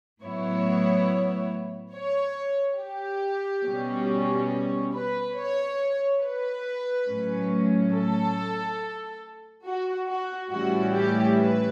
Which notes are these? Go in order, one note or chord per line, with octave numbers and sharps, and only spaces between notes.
A2 F#3 B3 E4 C#5
C#5
G4
B2 G3 C#4
B4
C#5
B4
A2 F#3 C#4
A4
F#4
F#4
A2 E3 G3 C#4 E4 F#4
G4
B4